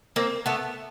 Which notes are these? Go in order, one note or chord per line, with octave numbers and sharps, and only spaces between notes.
A#3 C4
A3 B3